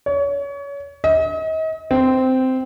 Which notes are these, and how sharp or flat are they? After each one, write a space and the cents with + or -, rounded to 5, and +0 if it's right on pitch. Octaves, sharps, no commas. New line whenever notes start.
C#5 +30
D#5 +40
C4 -10